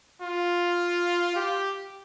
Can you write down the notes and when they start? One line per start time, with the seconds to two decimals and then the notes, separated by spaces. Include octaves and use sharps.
0.22 F4
1.36 G4